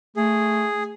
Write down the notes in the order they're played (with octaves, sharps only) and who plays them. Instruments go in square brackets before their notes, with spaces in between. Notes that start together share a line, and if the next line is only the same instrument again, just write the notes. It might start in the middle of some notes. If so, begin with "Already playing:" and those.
[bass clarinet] A3 [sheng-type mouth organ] G#4